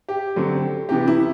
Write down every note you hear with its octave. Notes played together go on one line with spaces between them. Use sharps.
G4
D3 F#3 A3 C4
C3 E3 B3 G4
E4